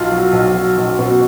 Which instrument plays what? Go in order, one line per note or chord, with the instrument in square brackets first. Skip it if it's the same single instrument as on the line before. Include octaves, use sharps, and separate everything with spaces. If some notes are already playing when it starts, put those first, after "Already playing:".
Already playing: [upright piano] B1 F4
F#3
B1
F#3
B1
B2